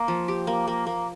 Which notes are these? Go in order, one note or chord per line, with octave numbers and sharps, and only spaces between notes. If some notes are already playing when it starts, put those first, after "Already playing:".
Already playing: A#3
F3
G4
A#3
A#3
A#3